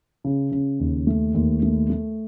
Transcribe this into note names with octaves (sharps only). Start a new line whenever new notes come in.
C#3
C#3
D#2
A3
D#2
A3
A3